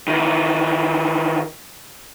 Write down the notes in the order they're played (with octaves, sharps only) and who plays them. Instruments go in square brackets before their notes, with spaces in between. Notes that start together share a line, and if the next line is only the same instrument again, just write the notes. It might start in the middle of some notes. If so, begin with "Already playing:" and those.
[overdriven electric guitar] D#3 E3